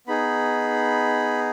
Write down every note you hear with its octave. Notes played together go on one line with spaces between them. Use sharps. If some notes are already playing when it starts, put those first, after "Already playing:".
B3 D#4 G#4 B5